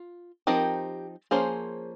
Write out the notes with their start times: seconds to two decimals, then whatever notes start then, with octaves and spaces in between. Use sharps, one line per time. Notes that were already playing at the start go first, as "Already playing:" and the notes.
Already playing: F4
0.47 F3 C4 D#4 G4 A#4
1.31 F3 A#3 C#4 G#4 C5